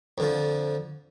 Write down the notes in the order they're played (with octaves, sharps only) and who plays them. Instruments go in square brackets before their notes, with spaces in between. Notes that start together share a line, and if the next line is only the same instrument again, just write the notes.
[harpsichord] F2 D3 F3